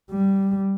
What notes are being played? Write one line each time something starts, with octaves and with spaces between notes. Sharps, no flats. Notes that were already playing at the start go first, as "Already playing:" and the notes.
G3